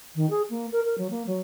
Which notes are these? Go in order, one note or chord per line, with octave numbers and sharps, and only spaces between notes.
D#3
G#4
A#3
A#4
A#4
F#3
A#3
F#3